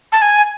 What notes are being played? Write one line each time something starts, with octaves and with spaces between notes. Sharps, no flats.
A5
G#5